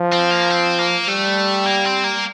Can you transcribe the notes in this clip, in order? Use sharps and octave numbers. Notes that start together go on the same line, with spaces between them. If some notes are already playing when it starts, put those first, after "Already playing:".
Already playing: F3
C4
A#3
C4
A#3
G3 A3
A#3
C4
A#3